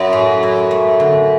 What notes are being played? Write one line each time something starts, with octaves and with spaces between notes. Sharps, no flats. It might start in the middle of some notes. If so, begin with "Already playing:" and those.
Already playing: F#2 F#3 E4
A2
E4
A3
D3